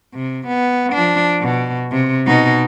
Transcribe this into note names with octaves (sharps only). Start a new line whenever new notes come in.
C3
B3
F3 D4
B2
C3
B2 D#4